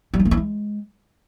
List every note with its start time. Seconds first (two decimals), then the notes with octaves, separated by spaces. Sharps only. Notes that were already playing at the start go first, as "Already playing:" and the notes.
0.14 G3
0.19 D#4
0.25 A3
0.31 E4
0.37 G#3